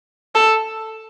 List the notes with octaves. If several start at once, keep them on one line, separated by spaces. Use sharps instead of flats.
A4